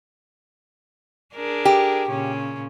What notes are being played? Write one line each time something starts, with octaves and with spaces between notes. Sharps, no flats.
D4 G#4 A#4
G4
A#2 C#3 C#4